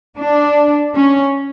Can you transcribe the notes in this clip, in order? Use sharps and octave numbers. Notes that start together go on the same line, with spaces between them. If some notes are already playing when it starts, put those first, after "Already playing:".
D4
C#4